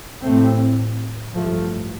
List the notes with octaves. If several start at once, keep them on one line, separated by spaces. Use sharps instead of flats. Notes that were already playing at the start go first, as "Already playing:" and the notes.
A1 A2 A3 C4
A1 G2 F3 A3